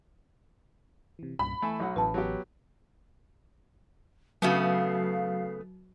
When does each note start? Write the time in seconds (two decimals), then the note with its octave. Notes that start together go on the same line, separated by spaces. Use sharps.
1.19 C3 E3
1.39 C2 G2 A#2 B5
1.62 E3 A3 G#5 E6
1.80 B1 F#3 F#5
1.96 A1 E3 C#4 B4 A5
2.14 F#3 B3 G4
4.42 C#3 F#3 A3 B3 F#4 F5